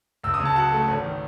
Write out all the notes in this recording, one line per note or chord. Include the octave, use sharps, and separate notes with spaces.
C#2 E6
D#6
C#3
A5
F#3 F#5
A3
G#1
D#3